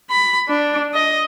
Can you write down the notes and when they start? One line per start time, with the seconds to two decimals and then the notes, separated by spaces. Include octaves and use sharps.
0.11 B5
0.49 D4
0.94 D#5